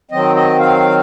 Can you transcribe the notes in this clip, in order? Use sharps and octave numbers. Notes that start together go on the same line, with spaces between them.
D#3 F#3 C4 D#5
D#5
F5